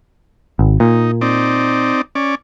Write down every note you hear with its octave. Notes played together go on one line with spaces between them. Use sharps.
G#1
A#2 D#4
C4 D#4 D5
C#4 D5